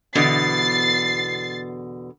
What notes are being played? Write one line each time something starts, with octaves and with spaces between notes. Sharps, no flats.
E2 B2 D3 A6 C7